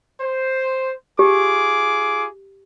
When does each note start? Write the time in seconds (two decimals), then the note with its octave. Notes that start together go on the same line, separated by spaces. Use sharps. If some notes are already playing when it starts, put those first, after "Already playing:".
0.21 C5
1.19 F4 G4 G#4 D6